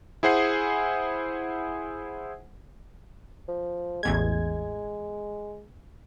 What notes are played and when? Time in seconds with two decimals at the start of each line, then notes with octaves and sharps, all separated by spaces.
0.23 E4 G#4 C5 F#5 G#5 C7
3.48 F3
4.03 A1 E2 G#3 G#6